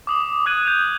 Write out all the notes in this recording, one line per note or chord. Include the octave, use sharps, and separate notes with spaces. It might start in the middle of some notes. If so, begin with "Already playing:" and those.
D6 D#6 F#7
D6 D#6 F#6 G#6 D#7 F#7
G6 F7